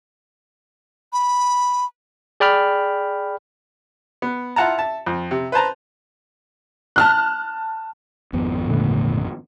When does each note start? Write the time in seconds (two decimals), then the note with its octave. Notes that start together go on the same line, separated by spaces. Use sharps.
1.13 B5
2.40 G#4 D5 G5 B5 F6
4.22 B3
4.56 E4 F4 F#5 A5 A#5
4.78 E5 A5
5.06 F2
5.31 C3
5.52 B4 C5 A5 A#5
6.96 A5 F6 F#6
8.33 G#1 F2 B3
8.68 A#2 D3 A3